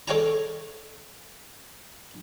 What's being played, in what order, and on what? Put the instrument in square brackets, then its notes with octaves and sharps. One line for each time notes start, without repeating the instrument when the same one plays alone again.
[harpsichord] A4 C#5 F5 G5 A5 A#5